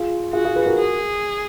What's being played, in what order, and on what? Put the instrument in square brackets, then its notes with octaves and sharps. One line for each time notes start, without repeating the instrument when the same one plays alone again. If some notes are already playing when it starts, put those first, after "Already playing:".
Already playing: [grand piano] F4 G#4
[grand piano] F4 G#4 [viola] F#4
[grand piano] F4 G#4
G#4 B4
F#4 A#4
[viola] G#4